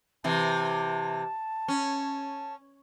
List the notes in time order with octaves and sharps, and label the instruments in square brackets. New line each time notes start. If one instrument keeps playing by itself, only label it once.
[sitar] C3 E3 [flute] A5
[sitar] C#4